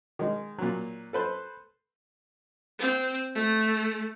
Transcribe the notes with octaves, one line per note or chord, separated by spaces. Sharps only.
D#3 G#3
A#2 F#3
A4 B4 C5
C4
A3